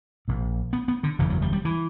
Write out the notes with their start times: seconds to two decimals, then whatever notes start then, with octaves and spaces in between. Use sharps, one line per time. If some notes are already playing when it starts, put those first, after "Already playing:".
0.28 A#1 A#2
0.73 B3
0.88 B3
1.03 D3
1.18 F#1 E2 C#3 E3
1.30 F#3
1.42 G3
1.53 G3
1.65 E3